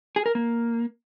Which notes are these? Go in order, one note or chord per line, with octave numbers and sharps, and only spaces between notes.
G#4
A#4
A#3